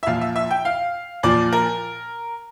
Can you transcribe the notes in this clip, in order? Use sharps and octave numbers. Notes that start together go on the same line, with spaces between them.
E5
A#2 F3 F5
E5
E5
G5
F5
A#2 F3 D5
A#4